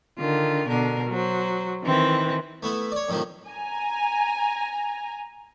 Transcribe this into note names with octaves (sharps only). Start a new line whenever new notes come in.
D3 D#3 F4
B2 D3 A#4
F#3 C5
D#3 E3 C4 E4
A3 B3 E4
C#5 D5
F2 A2 C3 D#3 F3
G#5 A#5